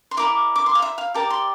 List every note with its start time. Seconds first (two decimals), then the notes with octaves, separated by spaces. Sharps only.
0.11 C6
0.17 E4 A#4 D5 D6
0.56 D6
0.66 C6
0.75 F5
0.82 E5
0.98 F5
1.14 G4 A#4 D5 A5
1.30 C6